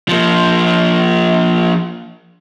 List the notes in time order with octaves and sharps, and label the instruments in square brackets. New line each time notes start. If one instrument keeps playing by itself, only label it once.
[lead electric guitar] F3 A#3